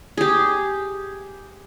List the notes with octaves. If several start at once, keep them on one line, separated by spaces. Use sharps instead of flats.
G4 G#4